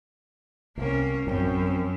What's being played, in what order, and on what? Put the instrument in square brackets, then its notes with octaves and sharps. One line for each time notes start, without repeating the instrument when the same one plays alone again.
[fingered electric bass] C2 C3 [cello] A#3 C#4
[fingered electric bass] A1 F#3 C4 [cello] F#2
[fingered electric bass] F3 C4